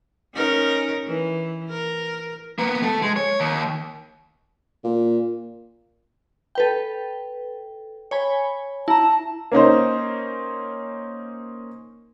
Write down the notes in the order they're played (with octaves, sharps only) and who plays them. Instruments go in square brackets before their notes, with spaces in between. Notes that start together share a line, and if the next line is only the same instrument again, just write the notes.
[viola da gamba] C#4 D#4 A#4
E3
A#4
[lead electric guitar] A#3 B3
A3 A4
G#3
C#5
D#2
[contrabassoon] A#2
[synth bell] A4 B4 G5
C#5 G#5 B5
[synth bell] E4 A#5 [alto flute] A5
[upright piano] A#3 C#4 D#4 C5